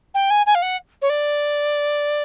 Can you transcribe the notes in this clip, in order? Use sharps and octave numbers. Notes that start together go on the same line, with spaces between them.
G5
G#5
G#5
F5
F#5
C#5
D5